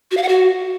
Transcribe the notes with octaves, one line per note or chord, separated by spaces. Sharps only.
F#4
F5
F#5
F#4